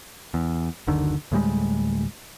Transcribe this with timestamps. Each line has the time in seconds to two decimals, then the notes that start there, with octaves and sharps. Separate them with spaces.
0.34 E2
0.87 F#1 D2 D3 D#3
1.32 D2 A2 G3 G#3